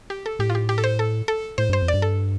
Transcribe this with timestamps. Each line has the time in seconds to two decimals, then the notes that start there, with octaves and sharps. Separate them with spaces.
0.10 G4
0.26 A4
0.39 A2 G4
0.50 F4
0.55 G4
0.69 G4
0.78 A4
0.84 C5
0.99 A4
1.28 A4
1.58 A2 C5
1.69 G2 C5
1.82 F2
1.88 D5
1.94 G2
2.02 A4